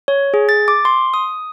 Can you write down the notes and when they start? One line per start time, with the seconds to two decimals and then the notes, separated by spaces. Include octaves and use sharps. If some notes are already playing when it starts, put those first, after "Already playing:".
0.08 C#5
0.34 G#4
0.49 A6
0.68 D6
0.85 C6
1.14 D#6